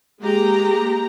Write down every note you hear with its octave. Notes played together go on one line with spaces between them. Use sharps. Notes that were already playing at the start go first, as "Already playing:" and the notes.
G#3 A#3 G4 A#5